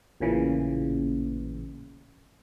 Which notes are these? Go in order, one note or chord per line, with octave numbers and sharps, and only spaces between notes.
A1 A#2 C#3 E3